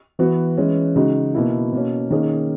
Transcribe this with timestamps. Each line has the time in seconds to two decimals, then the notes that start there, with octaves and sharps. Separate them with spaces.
0.19 E3 B3 F#4
0.57 E3 G#3 C#4
0.96 C#3 G#3 D#4 F#4
1.34 B2 A#3 E4
1.73 B2 A#3 C#4
2.11 D#3 A#3 C#4 G#4